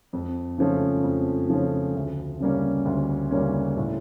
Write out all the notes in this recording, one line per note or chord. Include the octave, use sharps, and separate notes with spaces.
F2
C#3 F3 A3 C#4
F2
C#3 F3 A3 C#4
D2
C#3 G3 A#3 C#4
D2
C#3 G3 A#3 C#4
A2